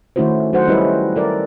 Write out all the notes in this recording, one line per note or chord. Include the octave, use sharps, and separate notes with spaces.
D#3 A3 C#4 E4 F#4 C5
F#3 D#4 F#4 A4 C5 F#5
G3 C#4 E4 B4 D#5
A4 A#4 D5